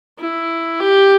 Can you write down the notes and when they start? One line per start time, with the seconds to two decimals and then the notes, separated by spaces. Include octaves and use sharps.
0.19 E4
0.79 G4